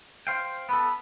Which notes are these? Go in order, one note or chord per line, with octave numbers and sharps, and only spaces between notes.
C5 F5 G5
B3 A4 B5